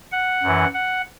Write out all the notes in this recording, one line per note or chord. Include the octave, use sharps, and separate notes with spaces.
F#5
F#2 E3
F#5